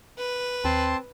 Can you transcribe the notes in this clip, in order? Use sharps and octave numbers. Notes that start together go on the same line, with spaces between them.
B4
D#2 C4 A5 C6